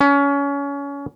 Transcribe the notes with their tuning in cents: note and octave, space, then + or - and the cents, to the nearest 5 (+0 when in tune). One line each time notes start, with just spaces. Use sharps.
C#4 +25